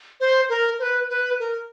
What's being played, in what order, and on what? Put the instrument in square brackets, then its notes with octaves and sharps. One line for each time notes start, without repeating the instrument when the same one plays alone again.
[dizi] C5
A#4
C5
B4
B4
A#4